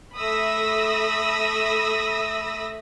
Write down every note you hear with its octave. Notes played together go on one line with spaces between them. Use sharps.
A3 E5 B5 D#6 E6 A#6